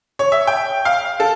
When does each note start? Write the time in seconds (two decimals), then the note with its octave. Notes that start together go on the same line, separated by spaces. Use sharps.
0.19 C#5
0.32 E5
0.47 G5
0.85 F5
1.20 A4